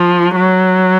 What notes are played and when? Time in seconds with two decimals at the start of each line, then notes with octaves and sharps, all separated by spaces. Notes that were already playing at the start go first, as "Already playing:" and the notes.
Already playing: F3
0.36 F#3